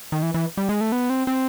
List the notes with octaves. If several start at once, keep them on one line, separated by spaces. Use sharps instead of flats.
D#3
E3
E3
G3
G#3
A3
B3
C4
C4